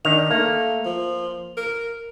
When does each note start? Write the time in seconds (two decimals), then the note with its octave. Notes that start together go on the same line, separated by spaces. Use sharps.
0.05 D#3 D4 F7
0.30 A3 A#3
0.85 F3
1.57 A#4